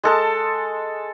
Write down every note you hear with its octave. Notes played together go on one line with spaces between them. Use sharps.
G#3 A4 A5